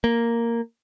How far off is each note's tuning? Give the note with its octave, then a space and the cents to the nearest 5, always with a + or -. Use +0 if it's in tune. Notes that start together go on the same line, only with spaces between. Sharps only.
A#3 -5